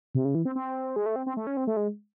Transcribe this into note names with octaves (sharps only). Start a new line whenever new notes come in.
C3
C#3
E3
C4
C4
G#3
A3
C4
C4
A3
C#4
C4
A3
G#3